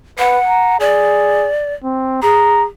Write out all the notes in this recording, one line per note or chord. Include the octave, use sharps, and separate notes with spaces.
B4 F#5
A#5
G#4 D5
C4
G#4 A#5